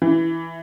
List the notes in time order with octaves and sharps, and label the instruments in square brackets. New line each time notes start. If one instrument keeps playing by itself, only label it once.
[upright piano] E3